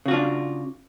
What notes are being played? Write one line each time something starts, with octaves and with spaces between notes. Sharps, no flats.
C#3 D4 F4 F#4